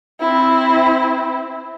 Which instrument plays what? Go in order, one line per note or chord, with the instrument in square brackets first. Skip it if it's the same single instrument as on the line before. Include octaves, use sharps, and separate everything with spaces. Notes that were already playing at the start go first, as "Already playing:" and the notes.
[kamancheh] C4 E4